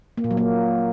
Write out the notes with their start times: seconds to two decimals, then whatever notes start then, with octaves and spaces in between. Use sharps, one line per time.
0.18 A#3
0.24 A#2
0.31 F#3
0.37 A#3